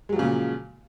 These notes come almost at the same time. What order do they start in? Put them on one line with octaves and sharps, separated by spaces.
G#3 F#3 F3 C#3 A#2